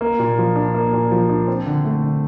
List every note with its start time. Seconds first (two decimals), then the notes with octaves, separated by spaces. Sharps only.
0.01 A#3
0.19 A#2
0.38 F3
0.56 D4
0.74 A#3
0.93 A#2
1.12 F3
1.30 D4
1.48 C4
1.66 D3
1.85 A3
2.03 D3